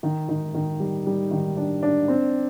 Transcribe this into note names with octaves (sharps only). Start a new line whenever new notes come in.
D#3
D#3
D#3
G3
G3
D#3
D4
D4
C4